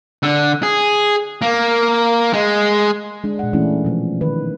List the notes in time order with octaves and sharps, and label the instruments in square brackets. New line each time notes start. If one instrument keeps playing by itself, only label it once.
[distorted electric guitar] D3
G#4
A#3
G#3
[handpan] G#3 D4
A#2 F#5
E3 A3 C#4 D4 E4
B2 F3
D#3 B4